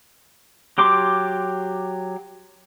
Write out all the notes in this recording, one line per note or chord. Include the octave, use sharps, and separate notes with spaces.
F#3 G4 C6 D6